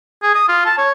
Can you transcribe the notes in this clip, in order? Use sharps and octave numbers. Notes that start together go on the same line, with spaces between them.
G#4
D#6
F4
A5
C#5